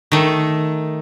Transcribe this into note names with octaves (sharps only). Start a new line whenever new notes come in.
D#3 A3